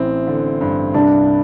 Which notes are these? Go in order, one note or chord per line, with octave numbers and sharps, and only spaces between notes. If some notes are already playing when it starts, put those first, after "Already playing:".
Already playing: A1 C4 E4
D3
G2
C2 D4